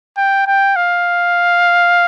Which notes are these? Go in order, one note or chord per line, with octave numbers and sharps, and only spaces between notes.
G5
G5
F5